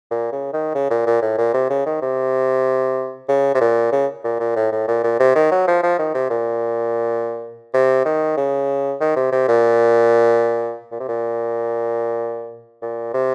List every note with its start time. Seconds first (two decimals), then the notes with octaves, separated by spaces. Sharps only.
0.11 A#2
0.32 C#3
0.53 D#3
0.75 C#3
0.90 A#2
1.06 A#2
1.22 A2
1.38 A#2
1.54 C3
1.70 C#3
1.86 D#3
2.02 C3
3.28 C#3
3.55 C3
3.60 A#2
3.92 C#3
4.24 A#2
4.40 A#2
4.56 A2
4.72 A2
4.88 A#2
5.03 A#2
5.20 C3
5.35 D#3
5.51 F#3
5.68 F3
5.83 F3
5.99 D#3
6.14 C3
6.30 A#2
7.74 C3
8.05 D#3
8.37 C#3
9.01 D#3
9.16 C3
9.32 C3
9.48 A#2
10.91 A#2
11.00 C3
11.08 A#2
12.82 A#2
13.14 C3